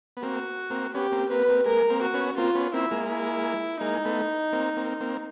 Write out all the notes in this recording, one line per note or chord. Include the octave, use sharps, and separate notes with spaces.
B3
A#3 C4 F#4
A#3 C4
B3 C#4 G4
A#3 C4
A#3 C4 B4
B3
A#3 C4
G#3 A#3 A#4
A#3 C4
F#4
B3 C#4
A#3 C4 F4
B3 C#4
A#3 C4 E4
G#3 A#3
E4
G#3 A#3 D#4
A3 B3
A#3 C4
A#3 C4
A#3 C4